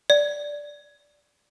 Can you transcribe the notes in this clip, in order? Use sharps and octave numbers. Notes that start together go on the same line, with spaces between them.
D5